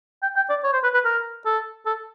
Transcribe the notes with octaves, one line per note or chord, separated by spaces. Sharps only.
G5
G5
D5
C#5
C5
B4
B4
A#4
A4
A4